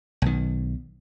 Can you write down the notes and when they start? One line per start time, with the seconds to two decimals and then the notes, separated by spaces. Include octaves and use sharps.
0.22 B1 D#3